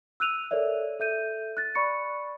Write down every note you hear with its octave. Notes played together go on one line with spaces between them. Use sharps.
E6 F#6 D#7 F7
A4 A#4 C#5 D5 E5
A4 E5 G6 D#7
F#6 A6
D5 B5 C#6 C#7